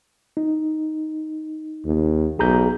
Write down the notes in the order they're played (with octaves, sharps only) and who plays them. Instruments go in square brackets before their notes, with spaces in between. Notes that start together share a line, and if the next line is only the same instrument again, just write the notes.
[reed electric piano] D#4
[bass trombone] D#2
[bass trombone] B1 [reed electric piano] G#4 A#5 G6